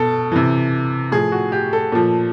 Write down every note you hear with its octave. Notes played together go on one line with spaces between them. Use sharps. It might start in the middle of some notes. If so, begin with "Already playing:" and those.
Already playing: B2 A4
C3 E3
A2 F3 G#4
F#4
G4
A4
A#2 F3